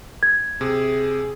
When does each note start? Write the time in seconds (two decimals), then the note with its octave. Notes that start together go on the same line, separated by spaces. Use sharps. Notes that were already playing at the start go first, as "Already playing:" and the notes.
0.23 G#6
0.61 C3 G#4